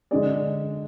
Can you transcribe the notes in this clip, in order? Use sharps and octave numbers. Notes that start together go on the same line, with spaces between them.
D3 G#3 D4 G#4 D5